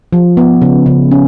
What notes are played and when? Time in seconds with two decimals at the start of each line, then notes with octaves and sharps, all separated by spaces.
0.13 F3
0.37 B3
0.62 C#3
0.86 C#3
1.11 C#4